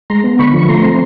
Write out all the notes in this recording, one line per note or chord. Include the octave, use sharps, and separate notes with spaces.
G#3 A#5 C6
B3
D3 B5 C#6
F3
C#6
A3 A#5 C6
C4